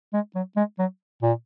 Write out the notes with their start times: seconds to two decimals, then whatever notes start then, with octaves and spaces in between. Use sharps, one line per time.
0.13 G#3
0.35 F#3
0.57 G#3
0.79 F#3
1.22 A#2